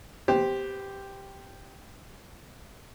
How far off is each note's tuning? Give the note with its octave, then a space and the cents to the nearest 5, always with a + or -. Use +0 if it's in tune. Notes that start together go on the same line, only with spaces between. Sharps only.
B3 +30 G4 +0 C5 +0